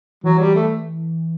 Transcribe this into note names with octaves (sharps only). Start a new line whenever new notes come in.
E3 F#3
G3
A3